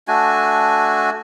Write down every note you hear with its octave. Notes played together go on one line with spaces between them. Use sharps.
A3 D4 F#4 G#5